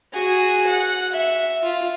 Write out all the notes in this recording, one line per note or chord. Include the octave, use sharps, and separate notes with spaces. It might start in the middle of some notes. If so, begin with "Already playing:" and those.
F#4 G#4
F#5
E5
F4